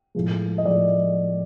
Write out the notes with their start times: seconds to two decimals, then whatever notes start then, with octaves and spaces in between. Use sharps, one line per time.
0.15 A2 F3 G#3
0.58 D#5
0.65 A2 F3 G#3 D5